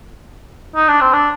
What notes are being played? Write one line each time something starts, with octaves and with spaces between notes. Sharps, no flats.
D#4
D4
C4
D4